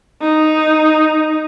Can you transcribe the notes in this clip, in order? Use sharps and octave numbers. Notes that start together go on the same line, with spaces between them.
D#4